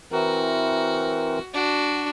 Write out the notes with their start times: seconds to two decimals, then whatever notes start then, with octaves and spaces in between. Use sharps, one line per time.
0.12 E3 C4 F#4 A#4
1.54 D4 F#4